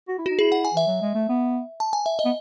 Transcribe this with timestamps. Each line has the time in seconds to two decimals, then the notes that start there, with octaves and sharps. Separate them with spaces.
0.08 F#4
0.18 E4
0.26 D#4 F#4
0.39 E4 G#4
0.52 F#5
0.65 G#5
0.73 E3 E5
0.87 F#3
1.02 G#3
1.15 A3
1.29 B3
1.80 A5
1.93 G#5
2.06 E5
2.19 D#5
2.25 B3